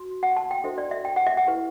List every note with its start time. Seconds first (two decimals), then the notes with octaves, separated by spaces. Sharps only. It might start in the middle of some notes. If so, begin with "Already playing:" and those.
Already playing: F#4
0.23 F#5
0.37 A5
0.51 G5
0.64 D4 F#4 A4 C5 E5
0.78 D5
0.91 E5
1.05 G5
1.16 F#5
1.27 E5
1.37 F#5
1.47 E4 G4 B4